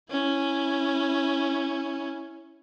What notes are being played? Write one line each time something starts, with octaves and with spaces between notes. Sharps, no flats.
C#4 E4